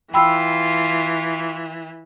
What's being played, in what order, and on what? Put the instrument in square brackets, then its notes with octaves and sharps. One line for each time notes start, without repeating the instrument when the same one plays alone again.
[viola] E3 [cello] F4 [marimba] G5 B5 E6